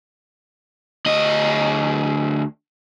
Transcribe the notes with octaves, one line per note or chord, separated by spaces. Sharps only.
D2 D#5